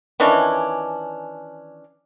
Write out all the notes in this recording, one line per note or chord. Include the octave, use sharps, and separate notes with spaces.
D#3 E3 C#4 D4